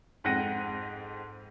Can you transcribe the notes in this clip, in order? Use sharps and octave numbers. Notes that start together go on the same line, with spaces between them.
F2 G#2 F#5 G5 A#6 D#7